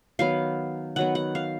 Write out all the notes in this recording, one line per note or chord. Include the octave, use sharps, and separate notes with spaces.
D#3 F#3 B3 F5
D#3 F#3 B3 F#5
F#5
F5